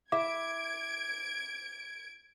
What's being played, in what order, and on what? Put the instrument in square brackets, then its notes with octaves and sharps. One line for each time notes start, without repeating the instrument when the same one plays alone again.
[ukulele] E4 E5 [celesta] D6 [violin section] G#6 D7